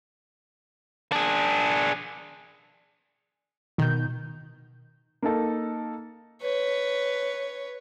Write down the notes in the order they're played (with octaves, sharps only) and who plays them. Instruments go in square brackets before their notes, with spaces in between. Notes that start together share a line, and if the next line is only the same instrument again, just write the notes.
[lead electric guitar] D4 G#4
[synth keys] B2 G6 [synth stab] D#3
[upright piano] A#3 D#4 A4
[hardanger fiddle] B4 C#5